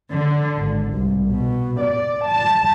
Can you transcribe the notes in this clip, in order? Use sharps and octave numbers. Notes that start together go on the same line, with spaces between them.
D3
G#1
C2
B2
D5
A5